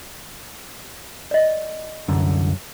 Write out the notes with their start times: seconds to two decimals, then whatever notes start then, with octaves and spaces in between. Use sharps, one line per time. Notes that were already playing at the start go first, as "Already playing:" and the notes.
1.31 D5 D#5
2.08 C2 F#2 D3